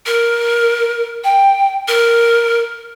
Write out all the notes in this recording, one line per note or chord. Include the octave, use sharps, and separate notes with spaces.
A#4
G5
A#4